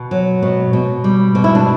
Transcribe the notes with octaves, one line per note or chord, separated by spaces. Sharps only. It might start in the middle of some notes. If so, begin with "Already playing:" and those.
Already playing: B2
F#3
B2
B2
G3
B2
E4
D4